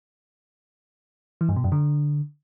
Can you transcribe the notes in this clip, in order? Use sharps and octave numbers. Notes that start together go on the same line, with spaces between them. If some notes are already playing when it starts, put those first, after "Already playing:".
E3
G2
B2
F#2
D3